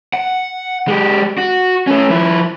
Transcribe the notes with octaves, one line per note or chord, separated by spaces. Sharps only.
F#5
G#3 G4
F#4
A3 C#4
F3 E4